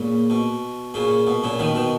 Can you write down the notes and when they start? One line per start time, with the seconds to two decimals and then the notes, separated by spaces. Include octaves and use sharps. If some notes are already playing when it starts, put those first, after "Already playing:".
Already playing: A#2 C#3
0.30 B2
0.94 A#2 C#3
1.27 B2
1.43 A#2 C#3
1.59 B2 D#3
1.75 B2 D#3